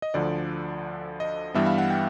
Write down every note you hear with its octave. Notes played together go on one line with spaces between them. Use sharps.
D#5
D2 D3 F3 D5
D#5
G2 E3 G3 B3 E5
F5
F#5
G5